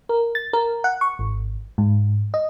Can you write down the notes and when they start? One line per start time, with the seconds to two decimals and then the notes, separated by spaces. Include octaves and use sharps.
0.09 A#4
0.35 A6
0.53 A#4
0.84 F#5
1.01 C#6
1.19 G#1
1.78 G#2
2.34 D#5